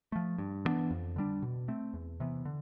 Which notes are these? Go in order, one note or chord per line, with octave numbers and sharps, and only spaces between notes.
F3 A3
G2
E3 B3 D4
F2
D3 G3 D4
B2
A3 C4
E2
C3 E3 B3
D3